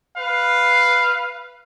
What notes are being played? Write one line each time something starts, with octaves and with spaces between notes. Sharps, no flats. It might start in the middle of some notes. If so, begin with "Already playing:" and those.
B4 F5